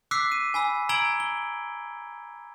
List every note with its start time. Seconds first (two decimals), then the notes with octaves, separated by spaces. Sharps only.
0.11 D6 E6 F#6 B6 C7
0.32 D#7
0.54 G#5 B5 E6
0.89 A#5 E6 G#6 D7 F#7 G7
1.20 G7